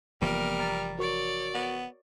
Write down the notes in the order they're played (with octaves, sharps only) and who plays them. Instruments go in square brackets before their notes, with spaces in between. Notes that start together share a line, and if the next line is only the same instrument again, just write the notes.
[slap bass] F1 E3 F3 [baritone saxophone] G3 [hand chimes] A#3 B3 [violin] A#4 F6
[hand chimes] A#5 A6
[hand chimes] F#4 A#4 C#6 [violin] C#5 D5
[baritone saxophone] B3